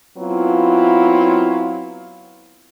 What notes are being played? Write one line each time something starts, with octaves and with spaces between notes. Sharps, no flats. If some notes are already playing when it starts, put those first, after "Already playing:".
F#3 B3 C4 E4 F4